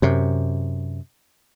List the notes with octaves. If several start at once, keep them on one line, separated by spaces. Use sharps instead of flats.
F#2 C3